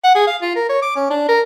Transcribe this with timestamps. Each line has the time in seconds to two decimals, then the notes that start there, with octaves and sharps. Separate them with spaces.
0.04 F#5
0.15 G#4
0.27 F5
0.42 F4
0.55 A#4
0.69 C#5
0.82 D6
0.96 C#4
1.10 D4
1.29 A#4